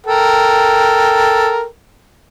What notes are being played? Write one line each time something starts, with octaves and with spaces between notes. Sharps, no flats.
A4 A#4 G5